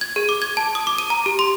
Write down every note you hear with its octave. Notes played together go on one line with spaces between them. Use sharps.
G#6
G#4
D6
G#6
A5
D#6
D6
D#7
A#5
G4
C6